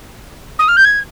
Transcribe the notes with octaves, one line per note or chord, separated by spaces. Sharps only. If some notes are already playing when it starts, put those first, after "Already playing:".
D#6
F6
G6
G#6